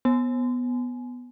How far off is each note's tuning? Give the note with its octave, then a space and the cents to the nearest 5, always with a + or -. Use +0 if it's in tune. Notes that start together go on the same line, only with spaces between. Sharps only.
B3 +0 G#5 +25